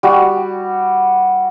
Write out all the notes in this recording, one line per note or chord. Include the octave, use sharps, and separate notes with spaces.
G3 F#4